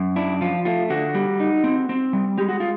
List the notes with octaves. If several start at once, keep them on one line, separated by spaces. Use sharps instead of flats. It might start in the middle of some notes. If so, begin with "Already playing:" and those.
Already playing: F#2
D4 E4
F3 F4
A3 F4
D3 F#4
G3
D#4
C4
C4
G3
G#3 G4
F#4
F4